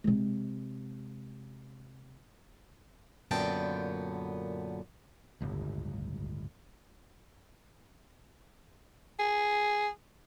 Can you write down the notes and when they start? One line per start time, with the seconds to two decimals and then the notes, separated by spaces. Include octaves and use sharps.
0.04 C3 G#3
3.31 F#2 A#2 D3 B3 G5 A5
5.41 D1 G1 C#2
9.19 G#4